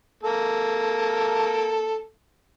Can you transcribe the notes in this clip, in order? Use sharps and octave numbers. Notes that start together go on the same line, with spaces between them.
A#3 A4